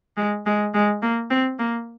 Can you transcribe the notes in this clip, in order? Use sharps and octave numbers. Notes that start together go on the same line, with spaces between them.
G#3
G#3
G#3
A#3
C4
A#3